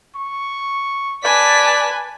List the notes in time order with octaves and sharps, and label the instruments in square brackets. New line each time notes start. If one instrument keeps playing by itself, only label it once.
[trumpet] C#6
[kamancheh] B4 G#5 [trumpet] D5 [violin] A5 B6